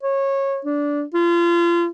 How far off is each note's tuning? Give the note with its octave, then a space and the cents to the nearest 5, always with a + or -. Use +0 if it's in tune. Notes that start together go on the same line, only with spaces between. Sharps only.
C#5 -20
D4 -15
F4 -30